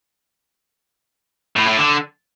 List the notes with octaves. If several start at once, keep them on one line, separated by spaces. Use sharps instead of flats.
A2
A2
D3